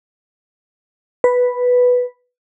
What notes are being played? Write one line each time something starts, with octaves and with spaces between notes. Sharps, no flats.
B4